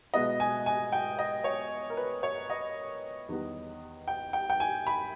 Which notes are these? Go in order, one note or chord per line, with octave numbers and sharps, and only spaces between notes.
B2 G#3 B3 E4 D#5
G#5
G#5
G5
D#5
C#5
A#4
B4
C#5
D#5
E2 D#3 G3 B3
G5
G5
G5
G#5
B5